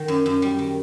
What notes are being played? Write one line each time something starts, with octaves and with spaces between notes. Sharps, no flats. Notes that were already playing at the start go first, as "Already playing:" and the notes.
Already playing: D#3
F#2
F#2
G3
D#3